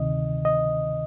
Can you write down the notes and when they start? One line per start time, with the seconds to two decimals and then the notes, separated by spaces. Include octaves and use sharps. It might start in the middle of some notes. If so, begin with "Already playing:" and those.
Already playing: D2 C3 D#3 D#5
0.45 D#5